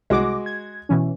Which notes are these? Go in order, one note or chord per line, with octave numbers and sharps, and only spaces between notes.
C2 G#3 F#4 D6
G#6
B2 E3 C#4